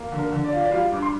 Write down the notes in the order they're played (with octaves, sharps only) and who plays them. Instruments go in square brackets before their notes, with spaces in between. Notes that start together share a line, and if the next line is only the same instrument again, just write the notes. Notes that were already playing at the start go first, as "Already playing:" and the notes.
Already playing: [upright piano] A#3
D3
A#4
D3
D5
F4 F5
D4 D5
G3 F4 F5
G2 D6
C6